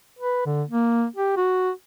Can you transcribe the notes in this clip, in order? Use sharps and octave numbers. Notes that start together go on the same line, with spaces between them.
B4
D3
A#3
G4
F#4